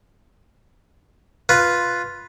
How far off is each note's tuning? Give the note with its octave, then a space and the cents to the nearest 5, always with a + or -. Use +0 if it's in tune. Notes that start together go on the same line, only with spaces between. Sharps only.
F4 +0 B4 +0